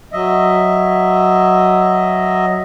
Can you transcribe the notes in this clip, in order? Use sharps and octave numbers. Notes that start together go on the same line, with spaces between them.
F#3 D#5 E5